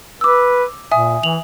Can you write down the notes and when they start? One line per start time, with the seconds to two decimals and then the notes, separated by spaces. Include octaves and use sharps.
0.21 B4 D6 E6
0.92 A#2 E5 G#5 D#6
1.23 E3 F7 F#7